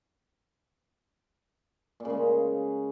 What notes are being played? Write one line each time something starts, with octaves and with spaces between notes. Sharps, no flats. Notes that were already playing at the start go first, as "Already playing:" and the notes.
A#2
C#3
G#3